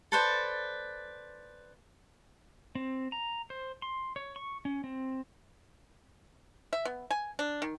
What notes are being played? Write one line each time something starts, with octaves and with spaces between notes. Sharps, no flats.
A4 B4 C5 D5
C4
A#5
C5
C6
C#5
C#6
C#4
C4
E5
B3
G#5
D4
D#3